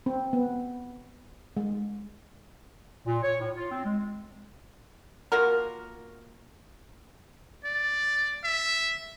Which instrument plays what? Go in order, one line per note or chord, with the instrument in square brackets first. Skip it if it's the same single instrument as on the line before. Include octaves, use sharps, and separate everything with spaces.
[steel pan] C4
B3
G#3
[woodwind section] A#2
C#5
A2
F4
C4
G#3
[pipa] A#3 F4 F#4 A#4
[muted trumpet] D5
E5